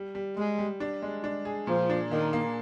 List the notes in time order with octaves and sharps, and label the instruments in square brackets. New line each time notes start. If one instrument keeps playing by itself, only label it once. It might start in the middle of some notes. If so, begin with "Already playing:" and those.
Already playing: [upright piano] G3
G3
[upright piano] G3 [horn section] G#3
[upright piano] G3
D4
G#3
D4
G#4
[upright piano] A#2 [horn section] F3
[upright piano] D4
[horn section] D#3 [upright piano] A#3
[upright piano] A#3